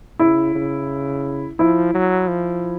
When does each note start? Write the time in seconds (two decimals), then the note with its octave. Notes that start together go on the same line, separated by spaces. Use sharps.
0.19 C#3 E4
0.55 C#3
1.59 F3 E4
1.94 F#3
2.28 F3